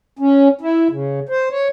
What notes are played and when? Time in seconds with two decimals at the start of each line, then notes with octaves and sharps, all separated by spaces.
0.19 C#4
0.61 E4
0.90 C#3
1.29 C5
1.50 C#5